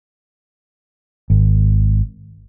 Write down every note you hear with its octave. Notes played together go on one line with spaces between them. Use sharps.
G#1